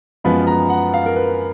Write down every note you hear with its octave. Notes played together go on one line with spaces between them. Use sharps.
F#2 F3 G#3 B3 B5
A#5
F#5
F5
A#4
B4